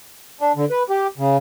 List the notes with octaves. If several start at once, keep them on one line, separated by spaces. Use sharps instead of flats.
D4
D3
B4
G4
C#3